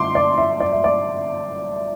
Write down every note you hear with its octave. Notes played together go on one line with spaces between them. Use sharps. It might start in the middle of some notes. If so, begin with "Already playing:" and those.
Already playing: G1 F#2 C6 D6
D5
E5
D5
E5
D5